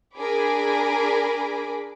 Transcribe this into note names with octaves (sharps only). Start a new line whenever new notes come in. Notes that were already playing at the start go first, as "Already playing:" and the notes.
D4 G#4 A#4 G#5 B5 D6